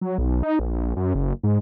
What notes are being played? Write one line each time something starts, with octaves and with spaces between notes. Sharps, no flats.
F#3
B1
D#4
A#1
F#2
F#1
G#2